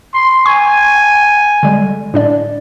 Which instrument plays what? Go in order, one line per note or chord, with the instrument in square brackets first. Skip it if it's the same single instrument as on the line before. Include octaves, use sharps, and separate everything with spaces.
[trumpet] C6
[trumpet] G#5 [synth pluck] C#6
[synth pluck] D3 G3 G#3
A2 D4 D5